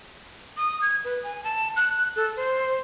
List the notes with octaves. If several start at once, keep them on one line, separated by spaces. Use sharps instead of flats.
D#6
G#6
B4
G#5
A5
F#6
A4
C5